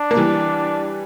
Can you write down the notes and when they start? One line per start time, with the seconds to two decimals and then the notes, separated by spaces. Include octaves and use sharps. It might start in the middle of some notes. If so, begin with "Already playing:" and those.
Already playing: D4
0.11 A#3
0.17 E3 G3